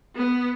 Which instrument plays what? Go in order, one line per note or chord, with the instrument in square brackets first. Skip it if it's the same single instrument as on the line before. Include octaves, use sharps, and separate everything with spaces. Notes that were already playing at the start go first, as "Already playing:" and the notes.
[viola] B3